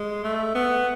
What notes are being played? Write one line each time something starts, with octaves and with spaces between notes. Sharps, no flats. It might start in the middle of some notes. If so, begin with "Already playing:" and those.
Already playing: G#3
A3
B3